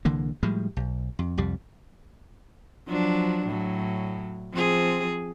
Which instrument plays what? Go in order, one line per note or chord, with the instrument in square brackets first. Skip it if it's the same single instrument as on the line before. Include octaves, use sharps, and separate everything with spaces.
[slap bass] C2 D3 E3 A#3
A2 F3 G3 G#3
B1
F2
C2 F2 G3
[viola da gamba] F3 F#3 D4
A2 F#3
F3 C4 G#4